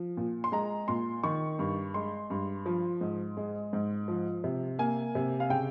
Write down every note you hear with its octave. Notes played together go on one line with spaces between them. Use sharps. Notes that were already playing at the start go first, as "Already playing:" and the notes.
Already playing: F3
A#2
C6
G#3 A#5
A#2 C6
D#3 C#6
G2
G#3 C6
G2
F3
G#2
G#3
G#2
F3
C3
A#3 G#5
C3
F5
C#3 G5